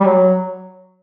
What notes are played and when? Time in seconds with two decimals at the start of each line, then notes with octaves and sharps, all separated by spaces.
0.01 G3
0.05 F#3